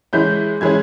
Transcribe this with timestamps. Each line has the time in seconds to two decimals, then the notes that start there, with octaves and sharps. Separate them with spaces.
0.13 E3 G#3 C#4 E4 G6
0.61 E3 G#3 C#4 E4 G#6